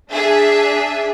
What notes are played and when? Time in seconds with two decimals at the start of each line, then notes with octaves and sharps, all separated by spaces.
0.12 D4 G#4 E5